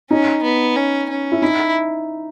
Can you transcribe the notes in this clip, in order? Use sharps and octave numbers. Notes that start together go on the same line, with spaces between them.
C#4 D#4
B3
C#4
C#4
E4
D#4 E4